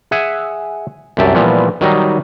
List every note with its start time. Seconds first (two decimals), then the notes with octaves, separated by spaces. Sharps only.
0.11 G#4 E5 F#5 G#5
1.17 C2 F#2 G4 E5 A5
1.35 A#2 E3 F3 G3 B3
1.81 D#3 F#3 G3 D#4